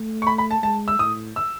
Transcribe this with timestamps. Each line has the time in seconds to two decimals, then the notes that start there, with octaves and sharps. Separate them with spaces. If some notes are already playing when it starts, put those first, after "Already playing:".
Already playing: A3
0.22 C#6
0.27 B5
0.38 B5
0.51 A5
0.62 G#3 A5
0.88 E6
0.99 A2 D#6
1.36 E6